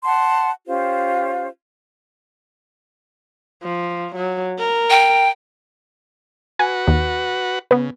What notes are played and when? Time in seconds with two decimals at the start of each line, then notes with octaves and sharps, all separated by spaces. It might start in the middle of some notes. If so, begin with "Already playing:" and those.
0.05 F#5 A5 C6
0.66 C#4 F4 G4 C5
3.63 F3
4.16 F#3
4.59 A#4
4.90 G5
6.59 F#4 B4 F#5 G#5
6.87 D#2
7.71 C#3 B3 B4